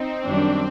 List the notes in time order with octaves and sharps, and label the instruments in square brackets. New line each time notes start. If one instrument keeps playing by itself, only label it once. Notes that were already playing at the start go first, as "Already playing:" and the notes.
Already playing: [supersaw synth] C4 [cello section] D#4
[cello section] F#2 D#3 G3 D4